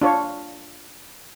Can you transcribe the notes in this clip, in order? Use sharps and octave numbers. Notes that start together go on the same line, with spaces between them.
D4 F4 C#5